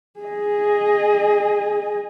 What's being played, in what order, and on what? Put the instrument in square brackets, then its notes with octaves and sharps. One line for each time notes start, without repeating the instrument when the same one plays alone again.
[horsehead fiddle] G#4 D#5